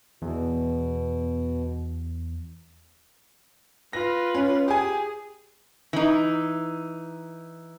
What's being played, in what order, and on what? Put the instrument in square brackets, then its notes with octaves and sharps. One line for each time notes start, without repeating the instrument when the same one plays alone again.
[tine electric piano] E2 [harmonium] B2
[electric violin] F4 B4 [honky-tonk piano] A#6
[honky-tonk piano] C#4
[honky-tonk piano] G4 G#5 [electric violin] G#4
[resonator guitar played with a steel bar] E3 D#4